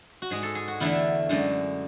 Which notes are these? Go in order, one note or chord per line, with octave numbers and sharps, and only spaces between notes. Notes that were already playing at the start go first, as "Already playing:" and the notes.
F#4
G#2 G#3 G#4
A4
G#4
F#4
E2 D3 A3 E4
F#2 D3 G#3